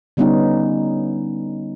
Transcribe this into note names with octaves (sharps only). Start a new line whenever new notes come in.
D3 G3 B3 C#4 D#4